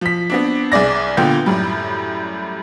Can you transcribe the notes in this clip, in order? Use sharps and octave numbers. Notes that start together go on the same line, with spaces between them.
F3 B6
B3 C4 D4
C2 G#4 D5 A#6
A#2 D3 B3 F4 G5 G6
F#2 A2 G3